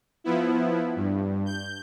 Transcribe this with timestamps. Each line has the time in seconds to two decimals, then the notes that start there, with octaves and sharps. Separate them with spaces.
0.24 F3 B3 E4
0.96 G2
1.46 G6